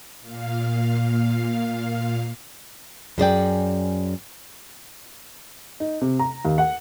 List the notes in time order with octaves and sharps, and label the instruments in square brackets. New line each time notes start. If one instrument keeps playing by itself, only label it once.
[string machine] A#2 F5
[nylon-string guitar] F#2 G#4 D5 G5
[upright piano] D#4
C3
A#5
D#2
F#5